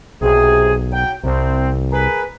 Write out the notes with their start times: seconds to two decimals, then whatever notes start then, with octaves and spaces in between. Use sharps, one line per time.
0.21 B1 C3 G#4
0.92 F#3 G5
1.24 C2 C3 C4
1.91 G#4 A#4 B4